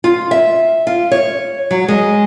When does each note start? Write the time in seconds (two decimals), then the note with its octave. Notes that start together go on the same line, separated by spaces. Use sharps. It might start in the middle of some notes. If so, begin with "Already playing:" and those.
0.04 F4
0.31 E5
0.87 F4
1.11 C#5
1.71 F#3
1.88 G#3